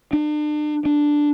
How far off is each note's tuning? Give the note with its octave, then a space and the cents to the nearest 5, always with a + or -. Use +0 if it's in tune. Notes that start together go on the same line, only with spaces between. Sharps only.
D4 +40
D4 +5